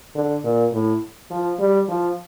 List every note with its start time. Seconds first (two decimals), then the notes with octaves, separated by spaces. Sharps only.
0.15 D3
0.44 A#2
0.73 A2
1.31 F3
1.60 G3
1.89 F3